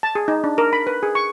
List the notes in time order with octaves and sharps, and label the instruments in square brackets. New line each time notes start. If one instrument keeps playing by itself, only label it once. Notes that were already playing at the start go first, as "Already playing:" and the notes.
[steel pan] A5
G#4
D#4
D4
A#4
B5
B4
G#4
C#6